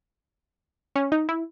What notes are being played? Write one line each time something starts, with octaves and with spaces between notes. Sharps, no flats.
C#4
D#4
E4